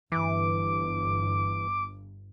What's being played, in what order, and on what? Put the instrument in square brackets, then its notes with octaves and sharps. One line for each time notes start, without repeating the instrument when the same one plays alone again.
[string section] G1 [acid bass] E3 [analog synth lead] D6